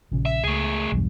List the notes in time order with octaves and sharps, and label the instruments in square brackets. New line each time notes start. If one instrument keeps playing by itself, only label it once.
[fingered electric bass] A#1 C#3
[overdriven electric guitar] E5
[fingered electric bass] C#2 [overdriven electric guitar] A3 G#4
[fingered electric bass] B1 E2 G2